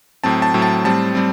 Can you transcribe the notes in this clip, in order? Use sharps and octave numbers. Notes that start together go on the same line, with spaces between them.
A2 F#3 C4 A5
A5
A2 F#3 C4
A5
A2 G3 C4 A5
G3 C4